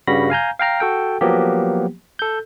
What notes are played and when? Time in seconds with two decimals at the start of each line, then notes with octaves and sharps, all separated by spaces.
0.07 G2 C#3 G3 F#4 B5 A#6
0.30 F5 G#5 A#5 G6
0.60 F5 G5 A#5 F6
0.80 F#4 A4 G5
1.21 F3 F#3 A#3 B3 G4
2.19 A4 G6